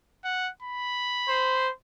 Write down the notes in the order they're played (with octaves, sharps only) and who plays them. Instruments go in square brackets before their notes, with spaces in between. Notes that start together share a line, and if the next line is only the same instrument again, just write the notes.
[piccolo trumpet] F#5
B5
[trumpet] C5